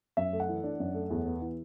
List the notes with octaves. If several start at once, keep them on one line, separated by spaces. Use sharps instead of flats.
F#2 E5
A3
F#5
E3
D4
F#2
A3
E2
B3
E3